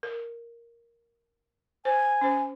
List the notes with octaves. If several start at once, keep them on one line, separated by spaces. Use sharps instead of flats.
A#4
C5 G#5
C#4 C5